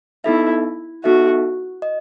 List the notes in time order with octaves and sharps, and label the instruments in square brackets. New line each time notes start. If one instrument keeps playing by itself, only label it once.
[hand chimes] B3 D#4 A4 E5 [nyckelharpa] E4
[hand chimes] B3 D#4 A4 E5 [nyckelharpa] F#4
[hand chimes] D#5